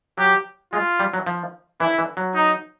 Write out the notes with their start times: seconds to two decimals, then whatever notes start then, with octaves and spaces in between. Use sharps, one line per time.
0.18 F#3 G4
0.73 G#3 F4
0.99 G3
1.14 F#3
1.26 F3
1.80 E3 E4
1.98 E3
2.17 F#3
2.35 D#4